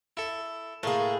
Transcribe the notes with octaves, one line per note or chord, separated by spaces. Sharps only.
E4 A4
A2 A3 A#3 G#4